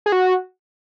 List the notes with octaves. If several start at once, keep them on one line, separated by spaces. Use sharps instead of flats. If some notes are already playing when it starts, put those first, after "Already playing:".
G#4
F#4